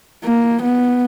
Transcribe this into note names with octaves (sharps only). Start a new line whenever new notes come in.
A#3
B3